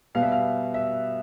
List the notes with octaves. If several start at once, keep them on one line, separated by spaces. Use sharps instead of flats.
B2 G3 B3 F5
E5
F5
E5